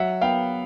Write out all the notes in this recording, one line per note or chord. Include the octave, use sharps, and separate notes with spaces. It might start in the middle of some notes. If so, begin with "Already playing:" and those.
Already playing: F#3 E5 F#5
B3 F5 G5